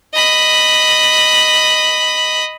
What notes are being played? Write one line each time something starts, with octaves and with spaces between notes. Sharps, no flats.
D#5 B5